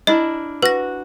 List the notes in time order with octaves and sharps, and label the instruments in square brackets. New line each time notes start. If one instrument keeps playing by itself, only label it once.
[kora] D4 E4 A#4 [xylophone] D#5
[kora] F#4 [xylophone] B4 A#6